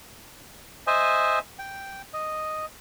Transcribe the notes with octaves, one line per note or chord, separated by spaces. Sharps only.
C5 D#5 E5 G#5
G5
D#5